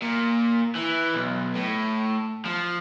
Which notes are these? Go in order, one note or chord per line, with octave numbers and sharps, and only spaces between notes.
A#2
E3
B1
A2
F3